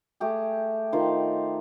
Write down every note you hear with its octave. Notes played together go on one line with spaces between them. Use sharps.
A3 G4 G#4
D#3 F4 C5